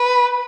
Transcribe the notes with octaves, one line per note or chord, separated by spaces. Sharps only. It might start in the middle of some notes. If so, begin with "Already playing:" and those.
Already playing: B4